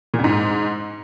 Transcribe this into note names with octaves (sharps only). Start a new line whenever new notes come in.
A#2
F2
G#2